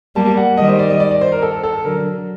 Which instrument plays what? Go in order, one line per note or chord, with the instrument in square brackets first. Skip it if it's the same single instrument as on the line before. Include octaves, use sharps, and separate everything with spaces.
[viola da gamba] G3 A#3 [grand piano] A5
[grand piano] F#5
[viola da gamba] D#3 G3 [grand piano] D#5
[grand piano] C5
D5
D#5
D5
D5
C5
A#4
A4
A4
[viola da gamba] D3 F#3 [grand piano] A#4